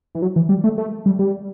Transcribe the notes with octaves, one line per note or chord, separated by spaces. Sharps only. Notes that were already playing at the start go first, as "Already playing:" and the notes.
E3
F#3
E3
G3
A3
A3
G3
G3